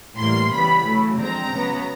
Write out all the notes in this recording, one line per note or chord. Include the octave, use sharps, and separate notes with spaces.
A2 E3 G3 A#3 C6
C#3 E3 G3 B3 B5
C#3 F#3 A3
D3 F3 G#3 C4 A#5
C#3 F#3 B3